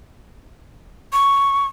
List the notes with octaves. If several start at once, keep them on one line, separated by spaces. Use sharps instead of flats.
C#6